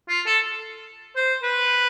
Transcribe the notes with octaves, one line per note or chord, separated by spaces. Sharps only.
F4
A4
C5
B4